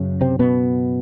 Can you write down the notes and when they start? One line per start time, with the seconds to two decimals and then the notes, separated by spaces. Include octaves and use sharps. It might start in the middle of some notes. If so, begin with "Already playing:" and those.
Already playing: F#2 C#3
0.21 C3 C4
0.39 B2 B3